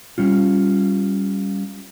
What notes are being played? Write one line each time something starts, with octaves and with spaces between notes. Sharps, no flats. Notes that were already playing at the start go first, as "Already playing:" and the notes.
G3 C#4 F4